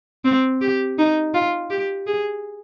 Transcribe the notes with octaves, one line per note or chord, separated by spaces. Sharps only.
C4
G4
D#4
F4
G4
G#4